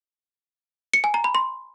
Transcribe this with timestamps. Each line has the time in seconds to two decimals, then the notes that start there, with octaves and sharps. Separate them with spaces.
0.94 C#7
1.04 G#5
1.14 A#5
1.24 B5
1.35 C6